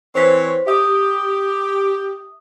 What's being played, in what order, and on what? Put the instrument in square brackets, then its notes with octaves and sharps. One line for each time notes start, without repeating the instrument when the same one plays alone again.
[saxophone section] E3 C4 C#5 [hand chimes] C5 B6
[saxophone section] G4 [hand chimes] E5 D#6